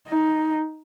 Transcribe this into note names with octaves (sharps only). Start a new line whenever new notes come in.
D#4